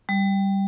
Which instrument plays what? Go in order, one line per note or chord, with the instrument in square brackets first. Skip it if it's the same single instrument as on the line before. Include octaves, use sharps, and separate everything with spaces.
[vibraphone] G3